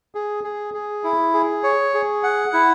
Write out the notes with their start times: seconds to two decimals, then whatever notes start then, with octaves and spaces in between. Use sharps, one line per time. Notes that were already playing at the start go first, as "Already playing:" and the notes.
0.15 G#4
0.44 G#4
0.74 G#4
1.04 E4
1.34 G#4
1.64 C#5
1.94 G#4
2.23 F#5
2.53 E4